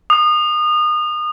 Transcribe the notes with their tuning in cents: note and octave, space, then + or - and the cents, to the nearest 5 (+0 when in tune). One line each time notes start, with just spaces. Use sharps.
D#6 -30